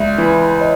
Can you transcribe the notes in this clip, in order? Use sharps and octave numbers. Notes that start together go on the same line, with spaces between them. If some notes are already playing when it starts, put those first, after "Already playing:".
Already playing: C#2 D5 E5
E3
C#5 D#5